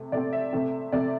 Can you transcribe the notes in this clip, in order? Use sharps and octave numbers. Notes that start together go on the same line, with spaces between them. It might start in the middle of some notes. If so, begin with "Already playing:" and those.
Already playing: C3 A3
C3 A3 C4 D5
E5
C3 A3 C4
C3 A3 C4 D5